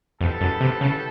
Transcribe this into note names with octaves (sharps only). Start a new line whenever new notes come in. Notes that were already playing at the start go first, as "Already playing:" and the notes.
F2 G3 B3 E4 A4
F#2
C3
C#3